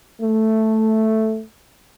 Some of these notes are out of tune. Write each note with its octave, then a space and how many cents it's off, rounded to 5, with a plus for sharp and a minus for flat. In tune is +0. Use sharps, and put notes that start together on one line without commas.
A3 +0